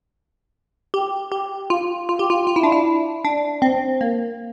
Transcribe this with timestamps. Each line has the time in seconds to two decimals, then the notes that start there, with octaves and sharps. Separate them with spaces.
0.94 G4
1.32 G4
1.70 F4
2.09 F4
2.19 G4
2.30 F4
2.47 F4
2.56 E4
2.63 D4
2.72 E4
3.25 D4
3.62 C4
4.01 A#3